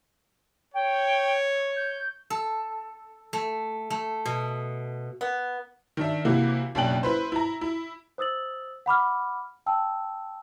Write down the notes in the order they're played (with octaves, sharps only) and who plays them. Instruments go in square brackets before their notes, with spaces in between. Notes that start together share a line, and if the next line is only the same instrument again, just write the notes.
[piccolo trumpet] C#5 [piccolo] G5
[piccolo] G6
[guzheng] A4
A3
A3
B2
[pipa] B3
[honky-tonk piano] D#3 D4 E5
C3 E3 A#3 E4 F#4
F#1 B2 D4 G5 F#7
E4 B4 C5
E4 A#5
E4
[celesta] C5 D#6 E6 A6 F#7
F#5 B5 D6 F6
G5 A5 E6